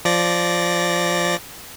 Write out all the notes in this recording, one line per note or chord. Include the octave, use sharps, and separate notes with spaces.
F3 D5 A#6